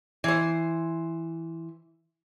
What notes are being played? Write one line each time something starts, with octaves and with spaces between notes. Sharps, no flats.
E3 C5